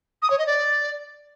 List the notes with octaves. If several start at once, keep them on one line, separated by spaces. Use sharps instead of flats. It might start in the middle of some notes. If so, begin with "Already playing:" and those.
D#6
C#5
D#5
D5